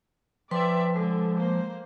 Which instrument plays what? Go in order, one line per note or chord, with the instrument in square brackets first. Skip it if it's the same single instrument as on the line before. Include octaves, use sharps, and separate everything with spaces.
[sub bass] F3 [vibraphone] B4 G5 C6 [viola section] D5 E5
[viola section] D3 [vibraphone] G#3
[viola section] A#3 C5